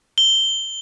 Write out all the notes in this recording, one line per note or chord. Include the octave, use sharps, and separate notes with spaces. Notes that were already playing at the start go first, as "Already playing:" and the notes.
G7